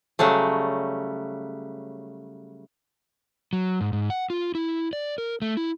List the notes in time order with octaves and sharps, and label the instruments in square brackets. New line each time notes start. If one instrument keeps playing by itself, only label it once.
[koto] C#3 F#3 G3 A3
[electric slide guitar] F#3
G#2
G#2
F#5
F4
E4
D5
A#4
A3
E4